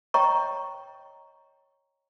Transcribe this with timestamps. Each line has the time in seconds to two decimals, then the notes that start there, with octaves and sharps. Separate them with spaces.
0.14 C#5 D#5 G5 A#5 C#6